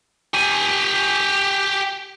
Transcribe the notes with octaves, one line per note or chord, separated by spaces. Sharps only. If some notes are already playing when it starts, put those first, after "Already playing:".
G4 G#5